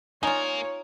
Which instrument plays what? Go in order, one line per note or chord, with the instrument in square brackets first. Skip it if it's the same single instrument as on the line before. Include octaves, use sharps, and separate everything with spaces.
[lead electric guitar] A#3 A#4 [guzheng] D#4 F4 [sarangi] C#5 [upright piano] G#5